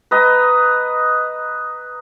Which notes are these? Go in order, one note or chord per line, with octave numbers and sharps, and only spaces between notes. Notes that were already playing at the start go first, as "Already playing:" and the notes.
B4 D#5 A#5